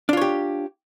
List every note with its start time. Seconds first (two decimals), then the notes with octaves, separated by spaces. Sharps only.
0.09 D4
0.13 F4
0.17 C#5
0.21 G4